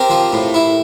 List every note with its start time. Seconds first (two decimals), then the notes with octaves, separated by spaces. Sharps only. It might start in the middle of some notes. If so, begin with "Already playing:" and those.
Already playing: C4 G4 A#4
0.10 F3
0.33 A2
0.54 E4